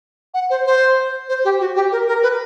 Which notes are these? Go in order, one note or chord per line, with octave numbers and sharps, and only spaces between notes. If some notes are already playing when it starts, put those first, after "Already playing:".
F#5
C5
C5
C5
G4
F#4
G4
A#4
A#4
B4